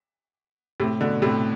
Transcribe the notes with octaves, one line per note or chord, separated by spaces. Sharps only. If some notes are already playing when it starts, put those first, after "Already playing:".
A2 C3
B2 D3
A2 C3